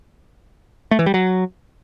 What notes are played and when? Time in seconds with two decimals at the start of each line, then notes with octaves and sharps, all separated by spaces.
0.91 A3
0.99 E3
1.06 G3
1.14 F#3